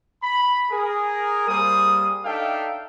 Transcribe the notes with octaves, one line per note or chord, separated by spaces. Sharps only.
B5
G#4 A#4
G3 A#3 G#4 C5 D#6
D4 D#4 A4 E5 F5 G5